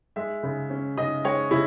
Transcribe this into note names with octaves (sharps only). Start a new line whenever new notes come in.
G#3 E5
C#3
C#4
C#3 D#5
G#3 C#5
C#3 E4